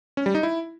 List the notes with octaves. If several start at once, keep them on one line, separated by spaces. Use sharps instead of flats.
C#4
G3
D#4
E4